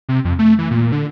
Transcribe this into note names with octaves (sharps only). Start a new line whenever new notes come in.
C3
F2
A3
E3
A#2
D3